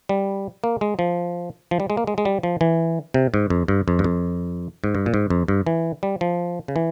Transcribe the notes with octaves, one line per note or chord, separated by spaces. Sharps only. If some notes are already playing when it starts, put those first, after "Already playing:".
G3
A#3
G#3
F3
F3
G3
G#3
A#3
G#3
G#3
G3
F3
E3
C3
G#2
F2
G2
F2
G2
F2
G#2
G2
A#2
G#2
F2
G2
E3
G3
F3
C#3
E3